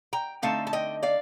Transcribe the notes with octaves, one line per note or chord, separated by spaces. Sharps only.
G5 A#5
D3 A3 C4 D#4 F5 A5
A5
D#5 G5
D5 F5